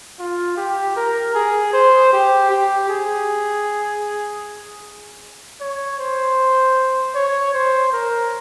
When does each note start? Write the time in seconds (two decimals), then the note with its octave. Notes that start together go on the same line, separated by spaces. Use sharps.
0.19 F4
0.57 G4
0.96 A#4
1.35 G#4
1.73 C5
2.13 G4
2.50 G4
2.89 G#4
5.60 C#5
5.99 C5
7.15 C#5
7.54 C5
7.93 A#4